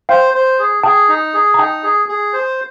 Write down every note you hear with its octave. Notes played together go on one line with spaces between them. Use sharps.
C5 F5 G5
C5
G#4
G#4 G5 A5
D#4
G#4
A#5
D#4 G5 A5
G#4
G#4
C5